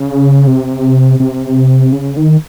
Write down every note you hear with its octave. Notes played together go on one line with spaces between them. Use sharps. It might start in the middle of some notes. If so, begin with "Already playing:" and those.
Already playing: C#3
C3
C3
C#3
D#3